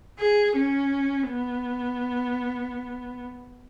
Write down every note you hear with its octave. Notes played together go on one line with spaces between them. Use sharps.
G#4
C#4
B3